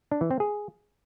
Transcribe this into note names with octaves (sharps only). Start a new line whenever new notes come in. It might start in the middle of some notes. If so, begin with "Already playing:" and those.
D4
E3
C4
G#4